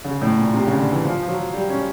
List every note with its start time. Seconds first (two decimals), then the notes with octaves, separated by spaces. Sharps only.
0.04 C#3
0.21 A2
0.37 A#2
0.54 C3
0.67 C#3
0.79 D3
0.92 E3
1.04 F3
1.22 F3
1.28 F#3
1.53 G3
1.70 C#4